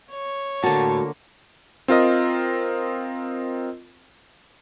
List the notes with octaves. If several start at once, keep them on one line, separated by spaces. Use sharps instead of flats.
C#5
A2 D3 A#3 F#4 A5
C4 F4 A#4 D#5